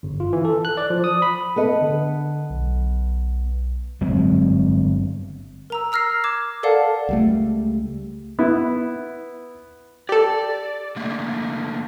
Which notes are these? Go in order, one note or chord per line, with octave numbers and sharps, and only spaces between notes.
G1
F4
E3
A4
F#6
D5
F3
D#6
B5
B3 A4 D#5
D3
B1
G1 F#3 G#3 C4
A#4 A#5 E6
A#5 E6 F6 A#6 C7
D6 G#6 E7
A4 A#4 D5 F5 F#5 A5
C#2 G3 A3
B3 E4
G4 A4 D5
D3 A3 A#3